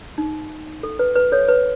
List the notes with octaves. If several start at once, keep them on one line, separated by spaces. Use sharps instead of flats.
D#4
A4
B4
B4
A4 C#5
B4